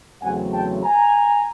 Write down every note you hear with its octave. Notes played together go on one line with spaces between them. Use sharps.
E2 C#3 F#3 A3 C4 F#5 G#5
G5 A5
G#5 A#5